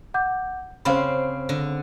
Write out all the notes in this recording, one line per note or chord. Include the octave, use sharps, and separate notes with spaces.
F#5 D6 G6
C#3 C4 C5 F5 B5
D3